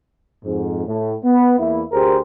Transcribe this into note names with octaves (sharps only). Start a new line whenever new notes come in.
F2 G#2
A2
B3
E2 A#3 E4
D2 G4 G#4 A#4 C5